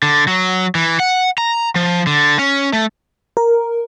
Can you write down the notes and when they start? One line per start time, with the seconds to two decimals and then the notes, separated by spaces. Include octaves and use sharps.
0.03 D3
0.27 F#3
0.75 E3
1.00 F#5
1.38 A#5
1.75 F3
2.07 D3
2.39 C#4
2.73 A3
3.37 A#4